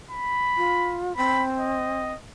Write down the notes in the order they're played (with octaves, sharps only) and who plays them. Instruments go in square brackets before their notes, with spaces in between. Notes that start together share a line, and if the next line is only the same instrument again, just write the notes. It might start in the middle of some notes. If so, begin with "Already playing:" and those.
[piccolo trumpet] B5
[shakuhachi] F4
[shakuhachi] C4 [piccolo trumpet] B5
[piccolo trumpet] D#5